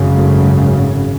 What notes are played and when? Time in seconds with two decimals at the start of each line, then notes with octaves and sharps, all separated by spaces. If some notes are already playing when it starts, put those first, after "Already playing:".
Already playing: G#1 F#2 C#3
0.14 A3